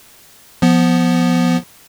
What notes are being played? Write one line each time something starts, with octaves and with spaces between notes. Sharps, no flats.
F3 B3